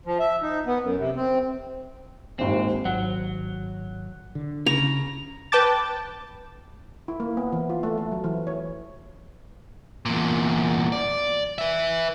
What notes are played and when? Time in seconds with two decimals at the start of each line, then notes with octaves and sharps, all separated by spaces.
0.05 F3
0.20 E5
0.42 D#4
0.66 B3
0.83 F#2
0.98 C3
1.16 C4
2.39 D#1 G#1 D#2 C4
2.85 G#1 F#3 F#5
4.35 D3
4.66 C#3 A#5
5.52 B4 G5 A5 D6 A6
7.08 E4
7.20 A#3
7.37 B3
7.52 E3
7.70 F4
7.83 A3
7.98 A3
8.12 F#3
8.24 E3
8.47 C#5
10.05 E2 A#2
10.92 D5
11.58 B4 E5